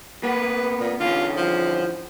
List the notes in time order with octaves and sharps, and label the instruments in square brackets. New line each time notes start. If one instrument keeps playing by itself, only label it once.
[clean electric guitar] A#3 B3 [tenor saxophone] B4
[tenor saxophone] A#2
[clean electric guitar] D3 E3 C#4 [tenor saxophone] F4
[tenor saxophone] F3